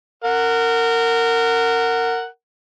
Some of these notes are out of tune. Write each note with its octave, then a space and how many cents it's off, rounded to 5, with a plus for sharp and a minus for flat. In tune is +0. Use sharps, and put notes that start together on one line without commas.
A#4 -20 F#5 +0